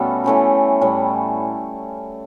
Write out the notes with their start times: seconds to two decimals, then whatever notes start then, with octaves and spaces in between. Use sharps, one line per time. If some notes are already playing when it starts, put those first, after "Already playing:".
Already playing: B2 G3 A3 B3 C#4 F#4 A4
0.24 E3 A3 C#4 G4
0.81 A2 G3 C#4